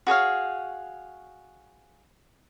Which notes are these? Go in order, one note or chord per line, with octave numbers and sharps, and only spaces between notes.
F#4 G#4 C#5 F5